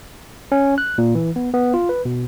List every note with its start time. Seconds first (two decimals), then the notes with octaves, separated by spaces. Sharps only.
0.52 C#4
0.78 F#6
0.98 A#2
1.15 E3
1.36 B3
1.54 B3
1.74 F4
1.89 B4
2.05 B2